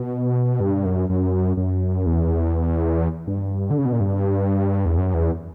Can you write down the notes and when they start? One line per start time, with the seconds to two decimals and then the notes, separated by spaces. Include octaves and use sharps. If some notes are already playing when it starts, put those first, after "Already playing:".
Already playing: B2
0.60 G2
0.85 F#2
1.09 F#2
1.57 F#2
2.06 E2
3.27 G2
3.70 D3
3.78 C#3
3.85 B2
3.93 A#2
4.00 G2
4.86 E2
4.98 F#2
5.14 E2